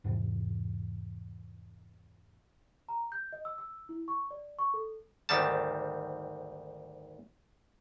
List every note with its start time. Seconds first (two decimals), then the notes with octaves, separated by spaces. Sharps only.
0.04 E2 G#2 C3 E3
2.89 A#5
3.12 G6
3.33 D#5
3.45 E6
3.58 E6
3.89 E4
4.08 C#6
4.31 D5
4.59 C#6
4.74 A4
5.29 G#1 D2 D#3 G3 A5